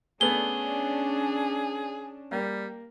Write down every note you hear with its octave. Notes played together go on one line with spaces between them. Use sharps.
A3 B3 C#4 D4 G#4 G7
G3 A#3